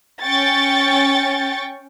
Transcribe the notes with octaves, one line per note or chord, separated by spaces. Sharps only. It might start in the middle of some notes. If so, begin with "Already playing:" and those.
C#4 G5 C#6 A6